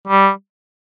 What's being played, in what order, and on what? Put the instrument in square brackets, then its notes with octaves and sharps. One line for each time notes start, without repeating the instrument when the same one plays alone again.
[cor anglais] G3